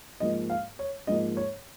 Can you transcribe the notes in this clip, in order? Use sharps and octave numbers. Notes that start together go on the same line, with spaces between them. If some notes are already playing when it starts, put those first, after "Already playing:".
G#2 F3 A#3 D#5
F5
C#5
G#2 F3 A#3 D#5
C#5